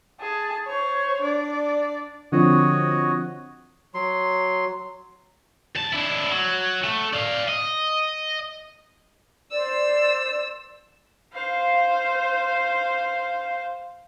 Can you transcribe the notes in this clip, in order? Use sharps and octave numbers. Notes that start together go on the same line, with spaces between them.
G#4 A5
C5 C#5
D4 D5
D3 F3 C4 F#4 C#5 D#5
F#3 C6
G#2 A5
D4 E4
F#3
A3
D5 F5
D#5
C5 D5 E6
C5 F5